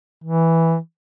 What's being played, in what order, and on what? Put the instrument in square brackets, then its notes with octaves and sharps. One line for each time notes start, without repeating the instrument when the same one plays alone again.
[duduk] E3